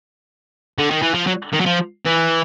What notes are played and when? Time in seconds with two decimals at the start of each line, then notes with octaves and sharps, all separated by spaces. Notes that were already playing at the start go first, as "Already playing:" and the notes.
0.79 D3
0.91 D#3
1.03 E3
1.15 F3
1.27 F#3
1.53 D#3
1.61 F#3
1.66 F3
2.06 E3